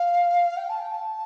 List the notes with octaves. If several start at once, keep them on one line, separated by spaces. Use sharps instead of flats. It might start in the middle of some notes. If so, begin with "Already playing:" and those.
Already playing: F5
G5
A5
G5
A5